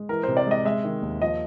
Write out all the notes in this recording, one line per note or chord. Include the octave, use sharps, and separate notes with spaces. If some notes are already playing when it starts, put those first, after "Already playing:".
Already playing: G#3
E3 A#4
C3 C5
D5
G#3 D#5
G#3 E5
D#3
D#2
F3 D#5